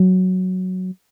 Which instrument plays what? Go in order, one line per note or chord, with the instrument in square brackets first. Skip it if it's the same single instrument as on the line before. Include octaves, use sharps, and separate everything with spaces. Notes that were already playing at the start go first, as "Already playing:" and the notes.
Already playing: [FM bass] F#3